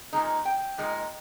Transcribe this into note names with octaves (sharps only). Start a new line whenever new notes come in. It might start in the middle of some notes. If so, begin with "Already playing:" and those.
A#2 G#3 D#4
G5
A#2 G#3 D#4